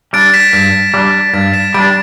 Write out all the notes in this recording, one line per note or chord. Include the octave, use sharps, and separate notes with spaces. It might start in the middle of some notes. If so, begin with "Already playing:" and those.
G3 D4 A6 D7
B6 E7
G2 B6 E7
G3 D4
G2 A6 D7
B6 E7
G3 D4 A6 D7